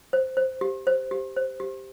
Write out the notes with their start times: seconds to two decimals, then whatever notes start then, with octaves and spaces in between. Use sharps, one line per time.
0.13 C5
0.37 C5
0.61 G4
0.87 C5
1.11 G4
1.36 C5
1.60 G4